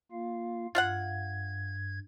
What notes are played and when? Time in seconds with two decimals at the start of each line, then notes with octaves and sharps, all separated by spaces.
0.12 A#3 F4 F5
0.75 G2 F4 F5 F#5 G#6